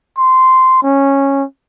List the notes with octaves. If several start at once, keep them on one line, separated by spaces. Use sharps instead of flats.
C6
C#4